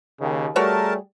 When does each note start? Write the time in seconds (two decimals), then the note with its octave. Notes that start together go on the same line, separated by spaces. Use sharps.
0.20 D#2 C#3
0.56 G3 A3 F#4 G#4 A#4 C#5 D5 A5